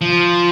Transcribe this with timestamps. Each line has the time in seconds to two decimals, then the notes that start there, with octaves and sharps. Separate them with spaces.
0.01 F3